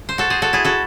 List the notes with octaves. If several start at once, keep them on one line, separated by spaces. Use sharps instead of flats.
C5
F#4 A4
G#4 C5
F#4 A4
E4 G#4
F#4 A4